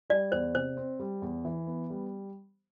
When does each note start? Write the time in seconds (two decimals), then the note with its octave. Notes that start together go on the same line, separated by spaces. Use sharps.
0.10 G3 D5
0.32 E2 C5
0.54 C3 C5
0.77 C4
1.00 G3
1.22 E2
1.45 E3
1.67 B3
1.90 G3